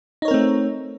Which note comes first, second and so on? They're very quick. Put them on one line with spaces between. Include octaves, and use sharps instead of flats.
D#4 C#5 A#4 C4 A3